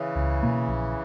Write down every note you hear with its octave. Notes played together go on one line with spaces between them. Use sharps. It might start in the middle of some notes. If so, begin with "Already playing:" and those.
Already playing: C#3 E3
C#2
B2 A#3
A#1